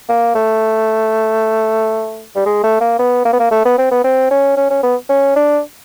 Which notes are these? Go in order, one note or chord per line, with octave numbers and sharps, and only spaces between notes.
A#3
A3
G3
G#3
A3
A#3
B3
A#3
B3
A#3
A3
B3
C4
B3
C4
C#4
C#4
C#4
B3
C#4
D4